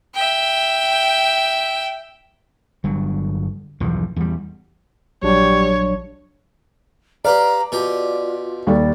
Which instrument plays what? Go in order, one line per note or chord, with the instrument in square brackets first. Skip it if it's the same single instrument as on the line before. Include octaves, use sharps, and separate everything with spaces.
[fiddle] E5 G5
[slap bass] G1 G2 F#3
B1 E2 G2 F3
E2 G3
[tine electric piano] A#1 F#3 D4 [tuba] G3 [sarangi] C#5
[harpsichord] G4 B4 F5 [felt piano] D5 [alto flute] A#5
[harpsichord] B2 G4 [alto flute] F4
[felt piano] D#2 G3 A4 [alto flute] D5